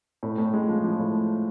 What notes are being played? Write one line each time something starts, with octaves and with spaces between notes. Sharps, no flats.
A2
A2
G#3
F3
F3
A2